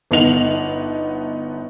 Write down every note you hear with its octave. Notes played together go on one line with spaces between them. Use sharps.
G1 B3 D#4 F7 F#7